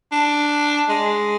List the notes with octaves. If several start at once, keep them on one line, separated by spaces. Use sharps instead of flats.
D4
G#3